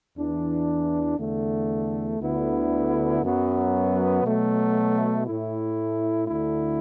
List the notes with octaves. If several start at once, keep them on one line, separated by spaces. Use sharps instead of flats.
E2 E3 D4
E2 D3 A3
D2 D3 B3 E4
F#2 F#3 B3
B2 F#3 A3
A2 A3 E4
D2 D3 A3 E4